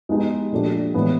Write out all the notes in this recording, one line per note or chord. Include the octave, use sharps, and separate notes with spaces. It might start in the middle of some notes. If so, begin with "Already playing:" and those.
G#3 B3 D#4 G4
A#2 F3 A3 D4 G4
A2 E3 G#3 B3